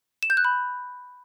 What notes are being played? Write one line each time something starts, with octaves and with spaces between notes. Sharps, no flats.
E7
G6
F#6
B5